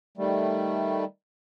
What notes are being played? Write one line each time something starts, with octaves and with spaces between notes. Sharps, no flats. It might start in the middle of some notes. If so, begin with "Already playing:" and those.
D#3 G3 A3